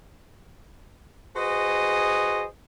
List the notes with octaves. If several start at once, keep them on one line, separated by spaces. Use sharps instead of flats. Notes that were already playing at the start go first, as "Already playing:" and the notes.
F#4 G#4 B4 C5 D#5